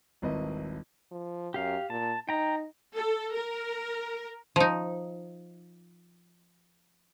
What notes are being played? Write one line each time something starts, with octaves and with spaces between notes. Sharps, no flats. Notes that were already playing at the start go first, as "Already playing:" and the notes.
D#1 G#1 C4 E4 B4 D#5
F3
F#2 G4 F5
A#2 A5
D#4 G5 A#5
A4
A#4
F3 D#4